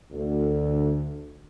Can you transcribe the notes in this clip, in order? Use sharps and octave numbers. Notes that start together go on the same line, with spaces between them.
D2